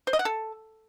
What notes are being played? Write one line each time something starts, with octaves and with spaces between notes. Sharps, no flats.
C5
D#5
F#5
A4